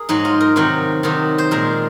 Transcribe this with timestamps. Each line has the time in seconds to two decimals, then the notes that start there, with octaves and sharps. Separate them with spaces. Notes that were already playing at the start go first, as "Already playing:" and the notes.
Already playing: G#4 A#4
0.09 G#2 F#3 D#4
0.25 F4
0.40 A#4
0.56 C3 D#3 F#3
1.03 C3 D#3 F#3
1.38 C5
1.51 A#2 G#3 A#4